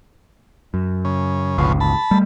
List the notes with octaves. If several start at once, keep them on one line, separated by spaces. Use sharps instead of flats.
F#2
C#3
G1 C#2 B2 F3 C#4
A5 B5
G3 A3